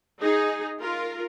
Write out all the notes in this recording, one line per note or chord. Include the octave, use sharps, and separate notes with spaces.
D#4 G#4
F4 A#4